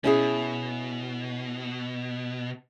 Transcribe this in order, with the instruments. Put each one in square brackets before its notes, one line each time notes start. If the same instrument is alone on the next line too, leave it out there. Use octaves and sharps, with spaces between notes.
[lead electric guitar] B2 [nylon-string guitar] C#4 E4 G#4